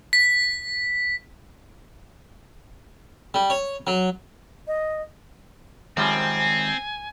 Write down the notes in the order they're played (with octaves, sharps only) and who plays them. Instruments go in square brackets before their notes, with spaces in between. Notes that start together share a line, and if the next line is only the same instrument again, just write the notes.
[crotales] B6
[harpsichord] G3
C#5
F#3
[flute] D#5
[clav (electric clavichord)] F#2 F3 G3 [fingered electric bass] D#3 G#3 [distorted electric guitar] C4 [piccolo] G#5